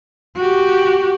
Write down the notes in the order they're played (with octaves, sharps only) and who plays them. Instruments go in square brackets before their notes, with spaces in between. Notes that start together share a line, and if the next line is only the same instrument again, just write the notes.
[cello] F#4 G4